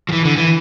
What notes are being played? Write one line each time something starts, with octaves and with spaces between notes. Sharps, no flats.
F3
E3
D3
E3